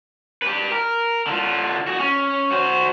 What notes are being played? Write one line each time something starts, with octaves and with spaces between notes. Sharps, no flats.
G4 B4
A#4
D3 F4
F#4 G#4
C#4
F#4 C5